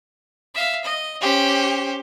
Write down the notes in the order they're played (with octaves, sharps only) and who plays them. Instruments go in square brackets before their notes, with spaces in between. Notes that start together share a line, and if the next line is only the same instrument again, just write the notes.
[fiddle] E5 F5
D#5
[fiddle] C#4 C5 [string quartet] G4